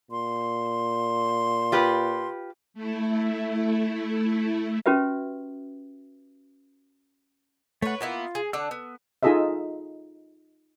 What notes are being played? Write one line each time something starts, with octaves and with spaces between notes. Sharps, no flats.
A#2 C6
F4 G4 B4
A3 E4
C#4 F#4 G4 B4 E5
A3 B4 C#5 F#5
A#3 B3 E4 F4
G#4
D3 D4 F#5 E6
B3
D#4 F4 G#4 A4 D#5 E5